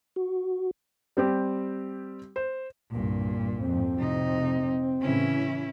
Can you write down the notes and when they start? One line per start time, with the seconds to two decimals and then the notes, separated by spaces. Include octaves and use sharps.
0.16 F#4
1.17 G3 C4 G4
2.36 C5
2.91 C2 G2 A#2
3.61 F2 G#2 C4
3.95 F2 A2 C3 D#4
5.02 A2 C#3 E3 C#4 E4